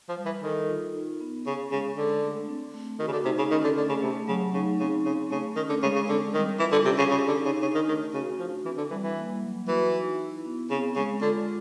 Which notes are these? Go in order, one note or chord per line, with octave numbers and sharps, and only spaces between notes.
F3
G3
E3
D#3 A4
F4
D#4
B3
C#3 C#4
C#3 G#3
D3 D4
A3
C4
A3
D#3 F#4
C#3
D3
C3 D#4
C#3
D#3 C#4
D3
D3 A3
C#3
C3 A3
C#3 F#3
C#3 D#4
C#3 C4
C#3 C4
C#3 A3
D#3 C#4
D3
C#3 G#3
C#3
D3 C4
D#3 G3
E3 F4
D3
C3 C#4
C#3
C#3 G4
D3
D#4
C#3
C#3 D4
D#3
D#3 A3
C#3 F#4
F3 D4
E3 C4
D3
E3 G3
E3
A#3
F#3
E3 F#4
D#4
E4
B3
C#3 C4
C#3 G#3
D3 F4